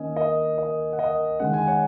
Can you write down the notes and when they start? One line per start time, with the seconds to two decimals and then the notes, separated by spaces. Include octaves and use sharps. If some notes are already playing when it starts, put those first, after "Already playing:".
Already playing: D#3 A#3 C#4 D#5 G#5
0.16 A#4 D#5
0.58 A#4 D#5
0.93 F#5
0.99 A#4 D#5
1.40 D#3 G#3 C#4 F#5
1.53 G#5
1.67 C#5 F#5